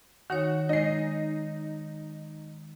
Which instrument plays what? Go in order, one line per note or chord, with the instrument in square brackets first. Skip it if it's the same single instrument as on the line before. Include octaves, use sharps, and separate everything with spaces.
[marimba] D#3 D#4 C#5 [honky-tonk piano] F#4
[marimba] G#3 [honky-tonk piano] D#4 C7